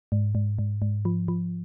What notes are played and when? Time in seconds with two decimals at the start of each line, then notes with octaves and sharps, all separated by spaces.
0.12 G#2
0.35 G#2
0.59 G#2
0.82 G#2
1.05 F3
1.28 F3